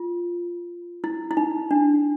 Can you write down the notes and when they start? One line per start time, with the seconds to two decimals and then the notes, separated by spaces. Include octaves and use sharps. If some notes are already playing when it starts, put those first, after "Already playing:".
Already playing: F4
1.04 E4
1.31 E4
1.37 D#4
1.71 D4